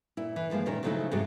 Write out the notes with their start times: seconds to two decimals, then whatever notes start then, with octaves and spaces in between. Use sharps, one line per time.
0.17 A#2 E4
0.36 E3
0.50 D3 D#3 F3 G#3 A#3
0.66 A#2 D#3 C#4 A#4
0.83 C#3 F3 F#3 A3 D#4 E4
1.11 F2 G#2 C3 F#3 G#3